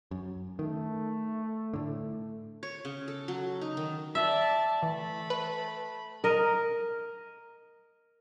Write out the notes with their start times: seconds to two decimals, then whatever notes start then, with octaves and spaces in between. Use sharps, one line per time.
0.11 F#2
0.59 D#3 A3
1.74 A2 D3
2.63 C#5
2.85 C#3
3.08 A4
3.28 F#3
3.61 D#4
3.77 D#3
4.15 D5 E5 A5
4.83 E3 A3 B5
5.30 B4
6.24 A#4 D#5